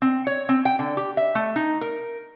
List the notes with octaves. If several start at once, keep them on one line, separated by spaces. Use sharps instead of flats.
C4
C#5
C4
G5
D3
G4
E5
A3
D#4
A#4